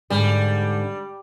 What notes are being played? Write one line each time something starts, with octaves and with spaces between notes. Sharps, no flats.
G#2 D3 G3